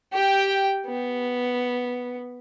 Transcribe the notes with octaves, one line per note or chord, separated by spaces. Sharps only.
G4 G5
B3